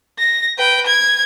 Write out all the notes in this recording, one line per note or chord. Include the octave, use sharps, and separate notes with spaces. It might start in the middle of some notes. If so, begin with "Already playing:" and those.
A#6
B4 G5
G#6